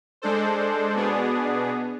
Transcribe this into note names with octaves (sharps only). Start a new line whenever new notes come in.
G#3 D4 A4 C5
B2 B3 D4 G#4